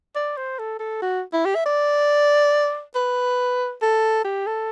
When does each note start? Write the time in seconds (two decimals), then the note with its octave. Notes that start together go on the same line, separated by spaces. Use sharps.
0.15 D5
0.37 C5
0.59 A4
0.79 A4
1.02 F#4
1.33 E4
1.45 G4
1.55 E5
1.66 D5
2.95 B4
3.82 A4
4.24 G4
4.47 A4